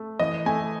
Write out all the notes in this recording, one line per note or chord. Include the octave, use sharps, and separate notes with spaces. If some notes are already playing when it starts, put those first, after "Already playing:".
Already playing: A3
E3 D#5
A3 G#5